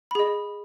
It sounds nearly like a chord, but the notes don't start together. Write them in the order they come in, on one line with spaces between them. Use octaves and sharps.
B5 G#4 D#5